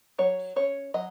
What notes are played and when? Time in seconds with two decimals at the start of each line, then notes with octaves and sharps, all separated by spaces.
0.18 F#3 C#5
0.56 C#4 C#5
0.94 F#3 D#5